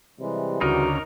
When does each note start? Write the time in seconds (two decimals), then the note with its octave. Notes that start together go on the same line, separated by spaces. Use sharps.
0.20 C3 E3 G3 G#3
0.61 D2 C#3 D#4 F#4 A#4